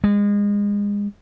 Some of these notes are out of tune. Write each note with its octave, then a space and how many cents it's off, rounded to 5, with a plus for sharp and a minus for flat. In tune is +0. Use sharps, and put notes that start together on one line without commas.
G#3 -30